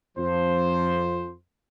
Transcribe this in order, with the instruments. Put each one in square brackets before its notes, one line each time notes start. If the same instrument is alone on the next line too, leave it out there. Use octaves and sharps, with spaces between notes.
[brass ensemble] F2 F3 C5